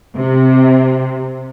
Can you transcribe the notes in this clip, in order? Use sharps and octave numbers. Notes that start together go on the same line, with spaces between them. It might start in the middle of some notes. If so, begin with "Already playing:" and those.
C3